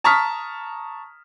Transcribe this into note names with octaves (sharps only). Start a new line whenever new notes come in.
A5 A#5 C#6 D#6 F6 B6